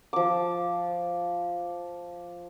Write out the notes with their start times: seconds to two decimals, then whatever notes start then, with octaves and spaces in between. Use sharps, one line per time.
0.13 F3 D6